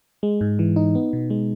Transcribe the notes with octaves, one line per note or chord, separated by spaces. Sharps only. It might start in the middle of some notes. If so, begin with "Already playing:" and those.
G#3
G#2
E3
D#4
B3
B2
G#3